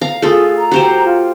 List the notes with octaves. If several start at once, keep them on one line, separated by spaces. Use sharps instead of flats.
F5 A#5
A3 F4 G#4
A#5
F#4 G4 C5
F4